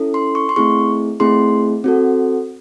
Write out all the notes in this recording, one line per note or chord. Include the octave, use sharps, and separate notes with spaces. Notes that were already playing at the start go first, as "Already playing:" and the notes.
Already playing: C#4 E4 A4
C6
C#6
C6
A3 C4 E4 G#4 C#6
A3 C4 E4 G#4 C6
C4 F#4 A4